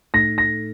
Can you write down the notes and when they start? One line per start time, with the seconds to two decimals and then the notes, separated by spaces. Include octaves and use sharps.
0.14 A2 A3 D#4 A4 A#6
0.38 A#6